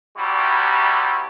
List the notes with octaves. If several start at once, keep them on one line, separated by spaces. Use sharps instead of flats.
C2 G3 E4 F#4